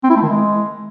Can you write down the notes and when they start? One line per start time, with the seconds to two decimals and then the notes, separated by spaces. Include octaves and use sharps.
0.04 C4
0.10 E4
0.16 A3
0.23 D#3
0.29 G#3